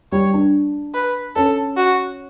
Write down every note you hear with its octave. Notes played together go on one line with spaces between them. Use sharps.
G3 C#5
D4
B4
C#4 A4
F#4